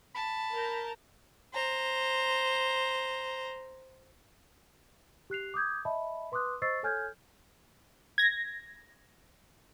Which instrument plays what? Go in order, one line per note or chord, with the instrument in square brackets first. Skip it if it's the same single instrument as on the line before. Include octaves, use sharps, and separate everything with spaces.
[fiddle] A5 [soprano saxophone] B5
[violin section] A#4 A#5 G6
[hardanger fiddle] C5 A#5
[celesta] G4 F#6 C7 F7
D6 D#6 G6 G#6
D#5 E5 A5 B5
B4 C6 D6 D#6 F#6
C5 D#5 C#6 E6 A6 C7
A4 C#5 G#5 F6 G6 G#6
[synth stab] G#6 A#6